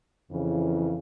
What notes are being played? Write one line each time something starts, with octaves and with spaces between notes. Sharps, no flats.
F2 C#3 E3